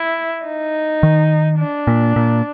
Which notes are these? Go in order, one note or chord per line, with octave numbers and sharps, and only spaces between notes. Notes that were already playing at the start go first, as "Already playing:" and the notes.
Already playing: E4
D#4
D#3
D4
A#2
A#2